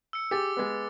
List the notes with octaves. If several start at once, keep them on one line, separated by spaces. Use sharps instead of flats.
E6 C#7
G4 G#4 D6 A6
G#3 B3